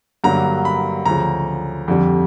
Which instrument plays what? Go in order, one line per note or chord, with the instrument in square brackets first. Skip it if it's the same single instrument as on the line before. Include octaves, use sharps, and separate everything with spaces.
[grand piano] G2 D3 F#3 A#3 A#5
B5
D2 C#3 F3 A#5
F2 D3 G3